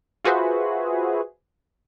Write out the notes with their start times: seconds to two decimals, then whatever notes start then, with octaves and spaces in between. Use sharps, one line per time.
0.24 F4 F#4 G#4 B4 C5 E5